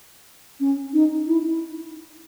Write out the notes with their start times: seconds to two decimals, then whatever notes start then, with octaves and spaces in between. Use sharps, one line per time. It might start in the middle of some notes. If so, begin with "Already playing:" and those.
0.60 C#4
0.93 D#4
1.27 E4